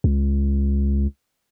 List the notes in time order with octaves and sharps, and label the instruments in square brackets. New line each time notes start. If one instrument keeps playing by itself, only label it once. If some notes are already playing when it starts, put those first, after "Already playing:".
[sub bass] C#2